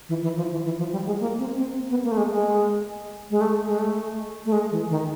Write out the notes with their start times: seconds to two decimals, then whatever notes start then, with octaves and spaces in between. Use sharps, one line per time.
0.09 E3
0.23 E3
0.37 F3
0.51 E3
0.65 E3
0.79 F3
0.92 G3
1.06 G#3
1.20 A#3
1.39 C4
1.57 C4
1.90 B3
2.04 A#3
2.12 A3
2.17 G#3
2.31 G#3
3.30 G#3
3.41 A3
3.67 G#3
3.79 A3
4.45 A3
4.52 G#3
4.71 E3
4.90 D#3